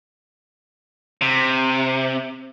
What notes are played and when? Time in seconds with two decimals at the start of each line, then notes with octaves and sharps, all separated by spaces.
1.21 C3